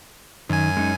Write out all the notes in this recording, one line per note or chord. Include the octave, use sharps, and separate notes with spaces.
F#2 D#3 G#5
G#3 C#4 D#4